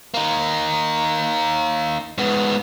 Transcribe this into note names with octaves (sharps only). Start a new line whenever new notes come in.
A#3 D#4
G#2 B3